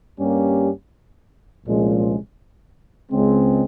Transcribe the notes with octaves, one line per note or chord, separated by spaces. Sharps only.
G2 G3 A#3 C#4 G4
C2 A#2 F3 G#3 C#4
C#2 C#3 G#3 C4